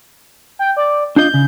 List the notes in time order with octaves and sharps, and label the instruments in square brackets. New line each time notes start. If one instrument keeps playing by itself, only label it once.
[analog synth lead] G5
D5
[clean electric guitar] D4 F4 D#5 [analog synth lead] G6
[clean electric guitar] C#3